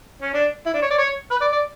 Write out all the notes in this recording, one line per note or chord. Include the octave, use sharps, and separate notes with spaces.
C#4
D4
E4
D4
C#5
D5
C#5
B4
D5
D5